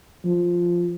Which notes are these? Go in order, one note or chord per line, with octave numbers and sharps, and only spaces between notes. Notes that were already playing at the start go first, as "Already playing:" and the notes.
F3